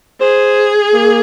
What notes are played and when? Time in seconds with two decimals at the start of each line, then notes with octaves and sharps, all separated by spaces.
0.21 G#4 C5
0.94 A#3